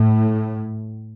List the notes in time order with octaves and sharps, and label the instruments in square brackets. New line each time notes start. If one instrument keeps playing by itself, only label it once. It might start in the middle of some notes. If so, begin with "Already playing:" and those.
Already playing: [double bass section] A2